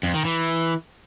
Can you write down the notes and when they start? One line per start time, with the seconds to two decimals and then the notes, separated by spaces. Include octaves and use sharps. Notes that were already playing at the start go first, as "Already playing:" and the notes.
0.03 F2
0.14 D#3
0.25 E3